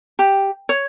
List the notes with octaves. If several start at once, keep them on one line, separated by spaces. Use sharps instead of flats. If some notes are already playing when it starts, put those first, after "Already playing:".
G4
C#5